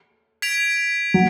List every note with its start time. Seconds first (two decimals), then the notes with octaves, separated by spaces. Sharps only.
0.42 G#6 B6 D7 F7
1.14 F#3